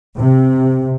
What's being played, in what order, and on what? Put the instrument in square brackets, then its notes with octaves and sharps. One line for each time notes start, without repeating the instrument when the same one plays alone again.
[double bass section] C3